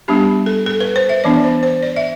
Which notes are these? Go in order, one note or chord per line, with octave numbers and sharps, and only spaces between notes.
G3 B3 D4 G4
A4
A4
B4
C5
E5
E3 B3 D4 D5
C5
C5
D5
E5